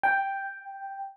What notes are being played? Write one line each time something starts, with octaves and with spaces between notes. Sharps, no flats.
G5